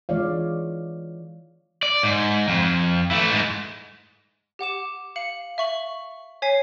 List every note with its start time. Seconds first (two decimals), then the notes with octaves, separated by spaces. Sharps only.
0.09 E3 G#3 F4 C#5 D5 F5
1.83 D5
2.03 G#2
2.48 F2
3.11 E3 A3
3.31 G#2 G#3
4.59 G4 F#5 D6 E7
5.16 F5 C#7 F#7
5.58 E5 C#6 F#7
6.42 C#5 G#5 B6 C7